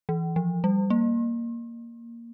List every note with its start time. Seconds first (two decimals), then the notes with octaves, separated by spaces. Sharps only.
0.09 E3
0.36 F3
0.64 G3
0.90 A#3